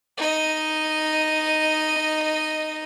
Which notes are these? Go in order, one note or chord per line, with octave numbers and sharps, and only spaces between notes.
D#4 D#5